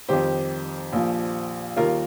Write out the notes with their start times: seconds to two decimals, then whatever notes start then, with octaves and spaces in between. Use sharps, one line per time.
0.09 F2 D#3 G3 G4 C5
0.92 A#1 A#2 F3
1.76 D#2 D#3 G3 F4 A#4